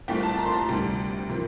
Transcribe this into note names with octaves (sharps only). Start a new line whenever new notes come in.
C2 A#2 A3 C4 G5
A5
A#5
C6
A#5
D2 C3 G3
C3 F3 A#3